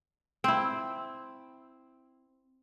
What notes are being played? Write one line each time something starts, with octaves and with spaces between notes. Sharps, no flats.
C4 E4